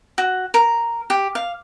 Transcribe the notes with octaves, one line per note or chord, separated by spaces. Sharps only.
F#4
A#4
G4
F5